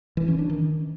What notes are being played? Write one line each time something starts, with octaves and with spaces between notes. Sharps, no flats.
E3
C#4
D4
D#3